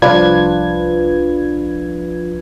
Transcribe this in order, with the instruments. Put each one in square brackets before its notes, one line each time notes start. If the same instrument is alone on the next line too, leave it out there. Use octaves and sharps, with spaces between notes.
[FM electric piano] C2 F3 D4 F4 B4 G#6